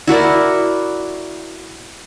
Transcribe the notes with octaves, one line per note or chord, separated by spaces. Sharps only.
E4 F#4 A#4 D5